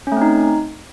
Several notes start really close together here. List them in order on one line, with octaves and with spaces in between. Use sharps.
C#4 A3 C4 D#4